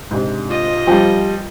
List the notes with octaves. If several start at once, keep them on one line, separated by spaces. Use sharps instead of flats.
G#2 C3 D4
F4 D#5
F3 G3 G5